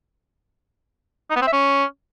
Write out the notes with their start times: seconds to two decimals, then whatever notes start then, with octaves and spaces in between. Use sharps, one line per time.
1.30 D#4
1.36 B3
1.41 C4
1.47 E5
1.53 C#4